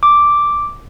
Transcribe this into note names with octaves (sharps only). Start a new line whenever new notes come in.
D6